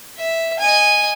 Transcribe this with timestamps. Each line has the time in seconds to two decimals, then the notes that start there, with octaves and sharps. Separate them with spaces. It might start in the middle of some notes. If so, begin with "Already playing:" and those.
0.17 E5
0.59 D#5 G#5